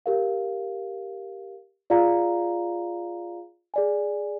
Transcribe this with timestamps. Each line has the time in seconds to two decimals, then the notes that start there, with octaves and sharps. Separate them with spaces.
0.06 G4 A#4 F5
1.90 F4 G#4 D5 F5 A#5
3.74 G#4 D5 G#5